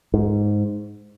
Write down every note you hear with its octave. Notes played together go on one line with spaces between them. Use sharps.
G#2